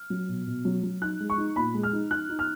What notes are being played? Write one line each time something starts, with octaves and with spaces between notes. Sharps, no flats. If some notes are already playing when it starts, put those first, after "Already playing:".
Already playing: F6
F#3
B2
B2
F#3
F#3
D#4 F#6
G#3
C#6
D#4
A#2 B5
G#3
F6
D#4
D#4 F#6
D#4
F6